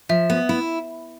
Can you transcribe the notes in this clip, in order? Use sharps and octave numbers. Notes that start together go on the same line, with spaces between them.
F3 E5
B3
E4